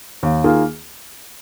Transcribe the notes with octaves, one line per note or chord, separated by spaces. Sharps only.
D#2
D#3 A#3 F4 G#4